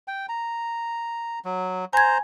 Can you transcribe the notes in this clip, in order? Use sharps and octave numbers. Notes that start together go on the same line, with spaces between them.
G5
A#5
F#3
C5 G#5 A#5 G#6